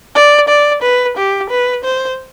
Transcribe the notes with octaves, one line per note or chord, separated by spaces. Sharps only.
D5
D5
B4
G4
B4
C5